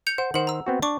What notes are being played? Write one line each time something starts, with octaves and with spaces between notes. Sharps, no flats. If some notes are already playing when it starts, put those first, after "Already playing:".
G6 C#7 F7
C5 F#5
D#3 C5 F#5 F#7
A#5 E6
B3 C4 F#4
D4 C#6 D6